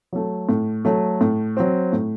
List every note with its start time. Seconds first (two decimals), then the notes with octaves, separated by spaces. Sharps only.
0.13 F#3 A3
0.49 A2
0.85 F#3 A3
1.21 A2
1.57 F#3 C4
1.93 A2